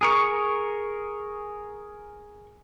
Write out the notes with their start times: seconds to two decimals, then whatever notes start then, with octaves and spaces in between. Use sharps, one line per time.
0.01 G#4 A#4 C#6